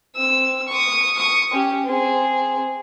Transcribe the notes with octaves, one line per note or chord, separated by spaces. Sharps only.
C4 E6
C#6 D#6
C#6 D#6
C#4 G4
C4 G#4